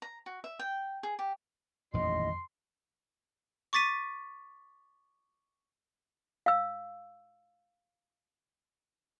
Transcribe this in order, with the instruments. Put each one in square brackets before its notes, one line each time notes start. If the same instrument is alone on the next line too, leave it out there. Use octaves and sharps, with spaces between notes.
[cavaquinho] A#5
F#4
E5
G5
G#4
G4
[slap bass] D#1 A1 D#3 [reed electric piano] F2 [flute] D#5 [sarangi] C6
[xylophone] C#6 D6 A6 B6 D#7
[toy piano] F5 E6